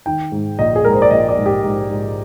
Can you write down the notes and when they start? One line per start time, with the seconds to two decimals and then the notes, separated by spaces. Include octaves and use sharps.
0.06 D#3 G5
0.32 G#2
0.59 A#1 D#5
0.76 G#4
0.85 G#2 A#4
0.93 C5
1.02 D5
1.11 A#1 D#5
1.29 D5
1.37 G#2
1.46 G4
1.64 G#2
1.90 G#2